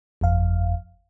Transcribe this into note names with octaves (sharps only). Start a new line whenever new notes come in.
G1 F2 F5